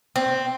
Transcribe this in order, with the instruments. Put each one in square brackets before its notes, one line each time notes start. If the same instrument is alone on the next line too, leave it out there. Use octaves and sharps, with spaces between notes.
[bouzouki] C4